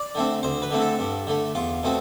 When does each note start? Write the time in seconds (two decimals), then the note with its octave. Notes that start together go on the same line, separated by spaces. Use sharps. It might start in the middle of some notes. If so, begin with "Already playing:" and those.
Already playing: D5
0.15 D3 A3 C4
0.43 D2 C5
0.62 B4
0.71 D3 A3 C4
0.81 A4
0.99 G2
1.27 D3 A3
1.55 E2 F4
1.83 B2 A3 C4